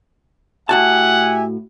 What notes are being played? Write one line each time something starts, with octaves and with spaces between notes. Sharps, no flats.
A2 F#4 G4 E5 F#5 G#5 A5